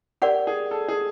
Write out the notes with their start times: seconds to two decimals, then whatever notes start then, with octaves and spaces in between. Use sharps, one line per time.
0.22 G4 A#4 D5 F#5
0.47 G#4
0.71 A4
0.88 G#4